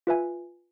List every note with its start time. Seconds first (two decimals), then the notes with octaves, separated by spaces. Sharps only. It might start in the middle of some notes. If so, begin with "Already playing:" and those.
0.07 F4 B4 E5 G#5